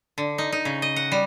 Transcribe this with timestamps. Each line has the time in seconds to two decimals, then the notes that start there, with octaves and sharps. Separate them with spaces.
0.18 D3
0.38 D#4
0.52 D#4
0.65 C#3
0.82 D#5
0.96 F#5
1.12 G3